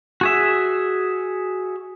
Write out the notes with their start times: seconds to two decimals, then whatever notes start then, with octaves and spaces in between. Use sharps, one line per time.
0.21 F#4 G#4 E5